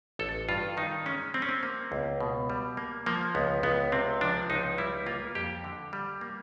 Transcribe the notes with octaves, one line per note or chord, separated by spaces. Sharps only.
A1 A4
G2 F4
D#3 D#4
G#3 C#4
G3 C4
C#4
C4
A#3
C#2
B2
G3
A#3
F3 A#3
C#2 B3
C#2 B3
C3 C4
F3 D4
C#2 D#4
G3 E4
A#3 F4
F2 G4
D3
G3
A#3